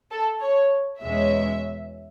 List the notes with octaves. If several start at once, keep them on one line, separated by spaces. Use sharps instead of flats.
A4
C#5
E2 B2 G#3 C#4 E5